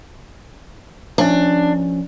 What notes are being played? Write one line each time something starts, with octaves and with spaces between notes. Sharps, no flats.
F3 C#4 D4